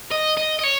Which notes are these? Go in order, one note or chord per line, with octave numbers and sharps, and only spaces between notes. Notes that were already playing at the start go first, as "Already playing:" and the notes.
D#5
D#5
D#5
C#5